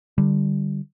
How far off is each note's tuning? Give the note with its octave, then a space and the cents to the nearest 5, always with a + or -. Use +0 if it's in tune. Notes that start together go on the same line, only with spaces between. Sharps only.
D3 +15 G3 -5